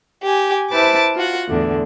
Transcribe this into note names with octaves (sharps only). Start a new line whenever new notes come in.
G4 G#5
E4 B4 C5 A5 D6
F4 F#4 F#5
E2 A2 D3